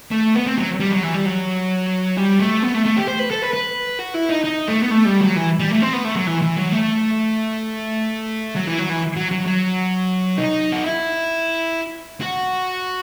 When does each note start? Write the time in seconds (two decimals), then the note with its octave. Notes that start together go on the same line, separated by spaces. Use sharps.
0.11 A3
0.34 B3
0.46 C4
0.57 F#3
0.80 G3
0.91 F#3
1.03 E3
1.14 G3
1.26 F#3
2.17 G3
2.39 A3
2.62 B3
2.74 A3
2.85 A3
2.97 G4
3.08 C5
3.19 B4
3.31 A4
3.42 B4
3.54 B4
3.99 F#4
4.15 E4
4.30 D#4
4.45 D#4
4.68 A3
4.83 B3
4.91 A3
5.06 G3
5.21 F#3
5.36 E3
5.60 G3
5.71 A3
5.82 C4
5.93 B3
6.05 A3
6.16 F#3
6.27 E3
6.42 E3
6.58 F#3
6.73 A3
8.56 F#3
8.67 E3
8.78 F#3
8.89 E3
9.17 F#3
9.32 F#3
9.46 F#3
10.38 D#4
10.72 F#4
10.84 E4
12.21 F#4